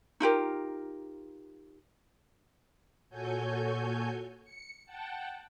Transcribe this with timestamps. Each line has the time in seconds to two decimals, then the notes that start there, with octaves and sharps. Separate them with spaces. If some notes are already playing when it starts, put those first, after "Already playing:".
0.20 D#4 F4 G4 A#4
3.10 A#2 F#4 A4 C#5 G#5 G6
4.44 C#7
4.86 F#5 G5 A5